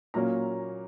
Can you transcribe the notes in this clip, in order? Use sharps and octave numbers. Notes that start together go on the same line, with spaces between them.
A#2 F#3 A#3 C#4 A#5